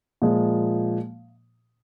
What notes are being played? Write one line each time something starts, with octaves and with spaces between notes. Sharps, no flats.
A#2 F3 G#3